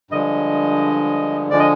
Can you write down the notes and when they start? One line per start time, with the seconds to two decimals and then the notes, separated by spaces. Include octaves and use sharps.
0.11 G2 D3 F3 G#3 D#5
1.50 D3 F3 G#3 D5
1.59 D#5